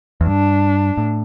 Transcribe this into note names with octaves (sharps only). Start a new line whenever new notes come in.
E2
G2 D4
A2